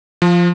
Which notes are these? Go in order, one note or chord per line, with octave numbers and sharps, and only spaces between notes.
F3